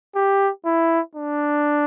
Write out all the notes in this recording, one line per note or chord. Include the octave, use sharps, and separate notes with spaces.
G4
E4
D4